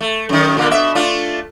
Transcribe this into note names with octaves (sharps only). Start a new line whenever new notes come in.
A3
F#2 D#3
A#2 D3 A#3
B2 E5
A3 D4 F4